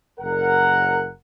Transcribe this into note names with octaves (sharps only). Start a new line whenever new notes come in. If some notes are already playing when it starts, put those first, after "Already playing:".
F#1 A#4 F#5